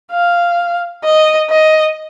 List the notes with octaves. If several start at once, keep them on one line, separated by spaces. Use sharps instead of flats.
F5
D#5
D#5